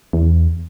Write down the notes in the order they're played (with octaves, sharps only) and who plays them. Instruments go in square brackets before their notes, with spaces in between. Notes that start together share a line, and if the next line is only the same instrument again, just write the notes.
[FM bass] E2